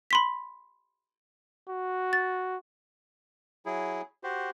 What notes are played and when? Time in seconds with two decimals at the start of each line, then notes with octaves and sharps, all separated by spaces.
0.11 B5 C6 B6
1.69 F#4
2.13 A6
3.66 F#3 E4 G#4
4.23 F#4 G4 C5